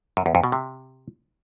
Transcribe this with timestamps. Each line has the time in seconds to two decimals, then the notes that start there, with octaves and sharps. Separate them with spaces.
0.17 F#2
0.26 E2
0.35 F2
0.44 B2
0.52 C3